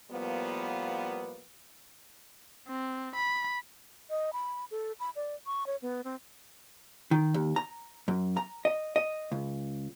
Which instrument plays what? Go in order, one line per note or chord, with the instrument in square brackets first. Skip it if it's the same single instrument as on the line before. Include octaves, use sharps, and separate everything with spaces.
[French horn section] A2 F3 G3 A#3 B3
[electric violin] C4
B5
[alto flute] D#5
B5
A4
B5
D5
C#6
C#5
B3
C4
[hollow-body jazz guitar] D#3
D#2
A#5
F#2
A#5
D#5
D#5
C#2